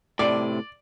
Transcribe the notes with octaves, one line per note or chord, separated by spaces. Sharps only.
A2 C3 D5